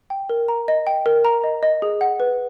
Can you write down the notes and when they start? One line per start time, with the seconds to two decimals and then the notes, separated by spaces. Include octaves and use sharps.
0.10 G5
0.29 A#4
0.48 A#5
0.68 D#5
0.87 G5
1.06 A#4
1.25 A#5
1.44 D#5
1.63 D#5
1.82 G#4
2.01 F#5
2.20 B4